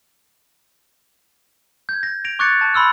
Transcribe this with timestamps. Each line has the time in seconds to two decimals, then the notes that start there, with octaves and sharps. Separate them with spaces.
1.89 G6 G#6
2.03 A#6
2.25 A#6 D7 F7
2.39 C#6 D6 F#6 G#6 A6 C#7
2.61 A5
2.74 B5 C6 E6 F6